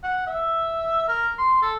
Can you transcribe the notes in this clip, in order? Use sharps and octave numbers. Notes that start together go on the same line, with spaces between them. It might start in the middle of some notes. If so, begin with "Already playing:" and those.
F#5
E5
A#4
C6
A4